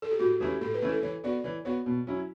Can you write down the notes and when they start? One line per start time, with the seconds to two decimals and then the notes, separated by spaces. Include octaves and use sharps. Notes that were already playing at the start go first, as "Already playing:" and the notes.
0.02 A4
0.11 G4
0.20 A2 F#4
0.40 E3 A3 C#4 E4 G4
0.61 A2 A4
0.74 B4
0.82 E3 A3 C#4 E4
0.89 A4
1.02 E3 C#5
1.24 B3 F#4 D5
1.44 E3 C#5
1.65 B3 F#4 C#5
1.86 B2
2.07 F#3 C#4 E4